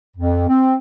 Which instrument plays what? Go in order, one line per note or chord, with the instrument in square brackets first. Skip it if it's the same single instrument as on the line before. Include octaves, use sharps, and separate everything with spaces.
[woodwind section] F2
C4